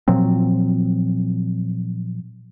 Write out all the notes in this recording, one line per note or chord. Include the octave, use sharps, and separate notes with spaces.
A#2 F3 F#3 C4